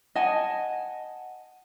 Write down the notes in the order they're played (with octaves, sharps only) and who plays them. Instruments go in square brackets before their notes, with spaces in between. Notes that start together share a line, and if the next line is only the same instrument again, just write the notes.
[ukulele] D#5 F#5 G#5 A5